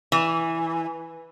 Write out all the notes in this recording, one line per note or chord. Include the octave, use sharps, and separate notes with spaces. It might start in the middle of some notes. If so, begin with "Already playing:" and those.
E3